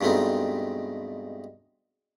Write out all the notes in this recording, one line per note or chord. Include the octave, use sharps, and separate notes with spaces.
G2 B2 G#3 A3 C4 D#4